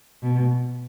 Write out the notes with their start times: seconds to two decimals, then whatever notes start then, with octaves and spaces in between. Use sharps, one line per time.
0.23 B2